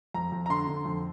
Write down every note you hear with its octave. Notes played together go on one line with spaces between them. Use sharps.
F2 A#5
F2
A#5
D3 C6
D3
F2